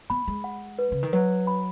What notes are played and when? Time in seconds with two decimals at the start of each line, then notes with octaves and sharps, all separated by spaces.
0.10 B3 B5
0.28 G#3
0.44 F#5
0.79 B4
0.92 C#3
1.03 D#3
1.13 F#3 B4
1.47 B5